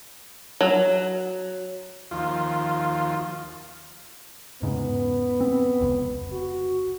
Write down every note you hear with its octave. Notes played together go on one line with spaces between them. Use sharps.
F#3
D#2 F3 F4
E2 G#2 C#3 B3
C4
F1 C#2
F#4